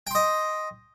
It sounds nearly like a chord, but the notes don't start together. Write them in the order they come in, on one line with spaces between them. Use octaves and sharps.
G5 C6 D#5